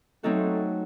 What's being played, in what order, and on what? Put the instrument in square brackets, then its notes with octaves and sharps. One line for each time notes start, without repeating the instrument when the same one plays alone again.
[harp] F#3 C4 D#4 F#4 A4 [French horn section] A3